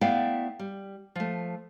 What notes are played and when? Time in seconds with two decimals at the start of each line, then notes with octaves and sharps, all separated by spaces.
0.01 A3 B3 E4 D5 F5 G5
0.59 G3
1.16 F3 A3